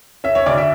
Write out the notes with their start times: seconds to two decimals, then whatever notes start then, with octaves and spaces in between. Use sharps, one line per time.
0.24 C#4 E5
0.35 C#5
0.46 D2 D5
0.58 E5